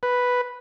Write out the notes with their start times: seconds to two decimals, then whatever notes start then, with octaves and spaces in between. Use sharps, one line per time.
0.03 B4